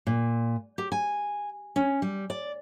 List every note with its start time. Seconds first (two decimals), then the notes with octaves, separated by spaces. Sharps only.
0.07 A#2
0.78 G4
0.92 G#5
1.76 C#4
2.02 G3
2.30 D5